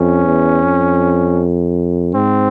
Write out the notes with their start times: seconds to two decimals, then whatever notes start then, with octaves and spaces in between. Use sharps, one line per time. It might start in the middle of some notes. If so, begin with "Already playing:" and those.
Already playing: F2 C#4
0.25 E2
0.63 F2
2.14 G#2 C4